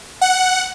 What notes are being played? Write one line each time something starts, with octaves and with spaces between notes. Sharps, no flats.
F#5